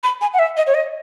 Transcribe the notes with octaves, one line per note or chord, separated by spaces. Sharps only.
B5
G#5
F#5
E5
D#5
C#5
D#5